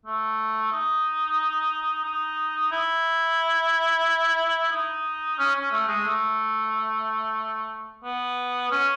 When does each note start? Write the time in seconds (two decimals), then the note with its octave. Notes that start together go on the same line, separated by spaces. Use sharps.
0.06 A3
0.72 D#4
2.04 D#4
2.71 E4
4.71 D#4
5.38 C#4
5.55 C#4
5.71 A3
5.88 G#3
6.04 A3
8.04 B3
8.70 C#4